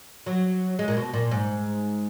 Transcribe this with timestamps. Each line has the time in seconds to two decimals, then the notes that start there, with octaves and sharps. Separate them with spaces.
0.26 F#3
0.79 G#3
0.88 A#2
0.97 B2
1.14 A#2
1.31 G#2